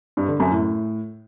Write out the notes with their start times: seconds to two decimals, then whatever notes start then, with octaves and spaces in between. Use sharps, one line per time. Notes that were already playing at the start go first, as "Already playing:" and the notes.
0.17 G2
0.28 D3
0.40 F#2
0.51 A2